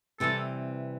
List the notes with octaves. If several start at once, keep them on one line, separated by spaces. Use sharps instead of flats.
C3 E3 G3 C4 A4